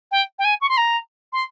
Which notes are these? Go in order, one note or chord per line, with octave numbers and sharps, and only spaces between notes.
G5
G5
G#5
C#6
C6
A#5
C6